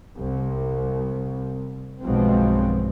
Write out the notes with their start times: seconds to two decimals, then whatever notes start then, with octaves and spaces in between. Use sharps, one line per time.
0.16 C2
2.02 B1 G2 B2 F3 G#3 C4